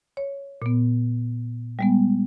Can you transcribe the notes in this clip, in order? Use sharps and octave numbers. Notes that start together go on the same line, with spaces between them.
C#5
A#2 B3
G3 G#3 B3